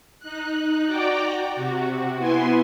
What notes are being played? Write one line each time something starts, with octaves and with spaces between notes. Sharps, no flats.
D#4 F#6
F#4 D5 G5 A#5 D6
C3 F#4
B3 E4 G#5 C6